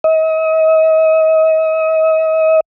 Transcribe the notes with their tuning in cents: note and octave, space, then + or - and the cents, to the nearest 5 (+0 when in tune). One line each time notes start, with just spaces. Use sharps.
D#5 +40